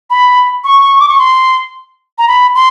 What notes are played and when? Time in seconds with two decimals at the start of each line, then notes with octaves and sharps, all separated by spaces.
0.10 B5
0.64 C#6
0.99 D6
1.09 C#6
1.19 C6
2.18 A#5
2.28 B5
2.55 C6